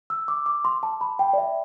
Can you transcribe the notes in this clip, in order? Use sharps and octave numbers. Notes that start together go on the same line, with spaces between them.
E6
D6
D6
C6
A5
B5
G5
D5
E5